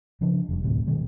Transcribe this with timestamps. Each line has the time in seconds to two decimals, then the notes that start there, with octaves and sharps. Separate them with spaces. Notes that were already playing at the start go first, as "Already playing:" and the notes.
0.21 C#3 F3 D4
0.49 F1 G2
0.63 D2 A2 C3
0.87 B2 D#3 G3 G#3